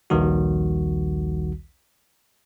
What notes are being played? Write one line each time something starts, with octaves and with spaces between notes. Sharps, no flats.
A#1 D#2 D#3 G3 F#4